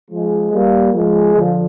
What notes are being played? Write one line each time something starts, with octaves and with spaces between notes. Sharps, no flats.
F3 G#3
G3 A#3
F3 G#3
D3 F3